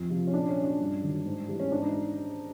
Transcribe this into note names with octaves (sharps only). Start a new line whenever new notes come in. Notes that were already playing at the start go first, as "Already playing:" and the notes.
Already playing: F2
C3 F3
C#4
A#2 D4
C#4
F#3
D4
G2
D#3 F#3
G#2
E3 G3
C#4
G#2 D4
D#4